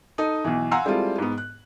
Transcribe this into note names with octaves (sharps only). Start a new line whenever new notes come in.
D#4 A4 D#5
B1 E3
F5 F#5 G#5 A#5 C6 E6
G3 G#3 C4 E4 F4 A4
G#2 B3
F#6